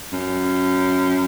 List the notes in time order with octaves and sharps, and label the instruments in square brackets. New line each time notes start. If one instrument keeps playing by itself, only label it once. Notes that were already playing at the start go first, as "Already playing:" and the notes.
[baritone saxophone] F#2